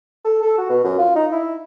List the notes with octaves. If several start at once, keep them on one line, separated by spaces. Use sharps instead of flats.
A4
A4
F#4
B2
F#2
F4
D#4
E4